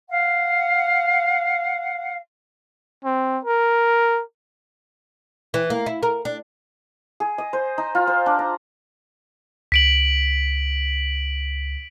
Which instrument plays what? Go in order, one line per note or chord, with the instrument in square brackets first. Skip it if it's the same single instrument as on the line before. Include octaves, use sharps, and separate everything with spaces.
[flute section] F5 F#5
[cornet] C4
A#4
[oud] E3
A#3
E4
A#4
D4
[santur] G#4
D#5
C5
D#4
F4
C5
D4
A#5
[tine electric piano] C#2 [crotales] B6 D7 F#7